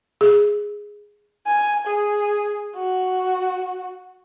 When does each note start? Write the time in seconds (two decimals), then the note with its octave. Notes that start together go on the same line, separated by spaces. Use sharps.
0.21 G#4
1.47 G#5
1.87 G#4
2.77 F#4